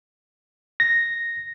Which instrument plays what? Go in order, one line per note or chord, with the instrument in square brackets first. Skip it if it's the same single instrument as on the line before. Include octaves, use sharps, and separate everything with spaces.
[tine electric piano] A#6